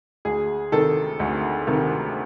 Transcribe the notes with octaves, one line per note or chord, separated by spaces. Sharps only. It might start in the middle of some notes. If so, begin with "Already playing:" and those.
D2 G#4
C3 D#3 A4
D2
C3 D#3